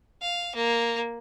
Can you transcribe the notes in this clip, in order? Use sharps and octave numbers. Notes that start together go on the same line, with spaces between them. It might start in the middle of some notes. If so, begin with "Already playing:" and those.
F5
A#3